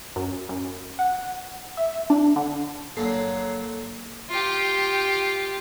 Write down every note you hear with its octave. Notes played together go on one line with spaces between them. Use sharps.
F#2
F#2
F#5
E5
D4
D3
G1 A#2 D3 F#3 D4 A4 C7
F4 G4